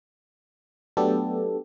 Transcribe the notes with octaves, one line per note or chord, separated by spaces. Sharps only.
F#3 A3 B3 D4 G4 A4